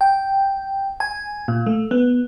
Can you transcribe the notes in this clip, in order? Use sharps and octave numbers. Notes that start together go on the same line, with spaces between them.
G5
G#5
A#2
A3
B3